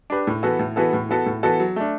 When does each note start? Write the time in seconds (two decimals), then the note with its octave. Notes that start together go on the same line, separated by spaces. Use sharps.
0.10 D4 G4 B4
0.27 A2
0.43 E3 B3 F#4 A4
0.59 A2
0.76 E3 B3 F#4 A4
0.93 A2
1.09 E3 B3 F#4 A4
1.26 A2
1.43 E3 B3 F#4 A4
1.60 F#3
1.76 A3 D4